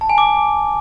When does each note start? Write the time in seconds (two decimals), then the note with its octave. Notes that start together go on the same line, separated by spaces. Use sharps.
0.01 A5
0.09 G#5
0.18 D6